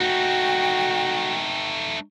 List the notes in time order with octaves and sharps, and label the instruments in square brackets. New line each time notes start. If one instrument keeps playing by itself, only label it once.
[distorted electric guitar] A3 D#4 [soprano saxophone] F#4 [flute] G5